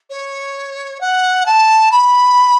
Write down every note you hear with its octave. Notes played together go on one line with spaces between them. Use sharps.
C#5
F#5
A5
B5